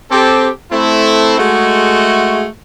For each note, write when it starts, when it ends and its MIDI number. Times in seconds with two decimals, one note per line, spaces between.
0.11 0.49 60
0.11 0.49 67
0.11 0.49 69
0.71 1.37 57
0.71 1.37 60
0.71 1.37 64
1.38 2.46 56
1.38 2.46 57
1.38 2.46 66